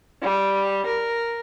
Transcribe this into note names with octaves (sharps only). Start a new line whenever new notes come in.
G3
A#4